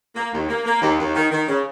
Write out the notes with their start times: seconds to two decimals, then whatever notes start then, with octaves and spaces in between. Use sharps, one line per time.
0.15 A#3
0.32 D#2
0.49 A#3
0.65 A#3
0.81 D#2
0.99 D#2
1.15 D#3
1.31 D#3
1.48 C#3